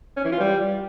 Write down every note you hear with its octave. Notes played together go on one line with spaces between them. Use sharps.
C#4
E3
F4
G3